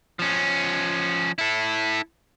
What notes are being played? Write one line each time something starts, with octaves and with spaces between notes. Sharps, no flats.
F3 C#4
E4 A4